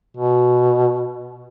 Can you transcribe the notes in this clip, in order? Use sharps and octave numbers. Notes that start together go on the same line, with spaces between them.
B2